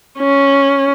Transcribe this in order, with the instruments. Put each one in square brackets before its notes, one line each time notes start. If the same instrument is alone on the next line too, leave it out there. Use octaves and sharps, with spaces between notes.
[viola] C#4